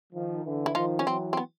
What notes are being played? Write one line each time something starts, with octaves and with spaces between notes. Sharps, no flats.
D#3 F3
D3 E3
E4
D#3 F3 D#4 F4
C#4
E3 F#3 C4
C4
B3